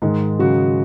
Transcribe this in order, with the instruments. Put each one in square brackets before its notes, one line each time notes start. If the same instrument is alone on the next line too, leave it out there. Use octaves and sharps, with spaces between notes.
[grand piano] G#2 [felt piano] D#3 G#3
[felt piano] C#3 F#3 [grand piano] F#4